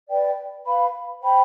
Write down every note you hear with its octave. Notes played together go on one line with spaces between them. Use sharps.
B4 D5 G5
B4 F5 B5
C5 G5 B5